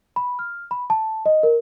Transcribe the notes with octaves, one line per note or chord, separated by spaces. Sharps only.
B5
F6
B5
A5
D#5
A#4